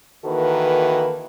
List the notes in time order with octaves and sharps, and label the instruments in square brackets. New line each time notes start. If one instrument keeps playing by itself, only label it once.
[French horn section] D#3 E3 A#3 F#4 A4 B4